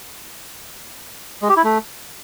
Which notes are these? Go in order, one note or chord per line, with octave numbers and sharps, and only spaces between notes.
G#3
G4
E4
A3